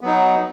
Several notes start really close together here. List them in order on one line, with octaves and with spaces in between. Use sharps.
B3 F#3 D#4